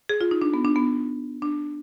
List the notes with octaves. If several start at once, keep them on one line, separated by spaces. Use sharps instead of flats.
G#4
F4
D#4
D4
B3
D4
B3
D4